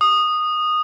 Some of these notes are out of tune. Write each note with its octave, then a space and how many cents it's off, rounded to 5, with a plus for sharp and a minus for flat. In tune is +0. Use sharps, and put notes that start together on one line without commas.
D#6 -15